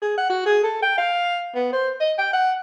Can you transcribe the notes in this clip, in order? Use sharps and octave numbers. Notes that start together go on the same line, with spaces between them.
G#4
F#5
F#4
G#4
A4
G5
F5
B3
C5
D#5
G5
F#5